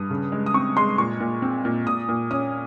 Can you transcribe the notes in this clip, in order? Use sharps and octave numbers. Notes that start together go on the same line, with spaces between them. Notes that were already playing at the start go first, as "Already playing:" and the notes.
Already playing: G2 D#6
C#3
G#3
D#6
C4 C#6
G#3 C6
A#2 C#6
A#2
C4
A#2
A#2 D#6
A#2
C#4 D#6